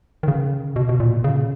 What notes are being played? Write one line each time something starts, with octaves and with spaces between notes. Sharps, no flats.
D#3
C#3
B2
B2
A#2
C#3